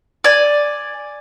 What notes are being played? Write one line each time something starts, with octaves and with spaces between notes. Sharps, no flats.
D5 G#5